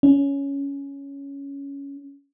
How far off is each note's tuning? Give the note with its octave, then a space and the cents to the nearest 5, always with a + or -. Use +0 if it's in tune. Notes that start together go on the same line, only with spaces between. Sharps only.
C#4 +10